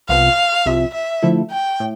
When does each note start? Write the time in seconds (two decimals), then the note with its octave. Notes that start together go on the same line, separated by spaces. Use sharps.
0.09 C2 C3 F3 B3 F5
0.66 C2 C3 F3 E5
0.94 E5
1.23 D3 F3 A3 E4 A4
1.51 G5
1.80 A2